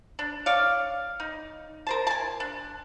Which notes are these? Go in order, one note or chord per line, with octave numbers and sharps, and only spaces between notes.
D4
C#5 D5 F5
D#4
A#4 C5 A5
G#5 A5
D4